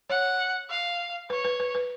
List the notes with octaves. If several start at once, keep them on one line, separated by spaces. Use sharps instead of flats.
C#5 F#5
F5
B4 C#5
B4
B4
B4